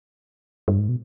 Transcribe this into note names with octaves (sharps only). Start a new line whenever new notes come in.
G2
G#2
B2